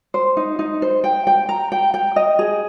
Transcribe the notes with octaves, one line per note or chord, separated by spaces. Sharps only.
C5
D#4
D#4
C5
G5
G5
A#5
G5
G5
D#5
G#4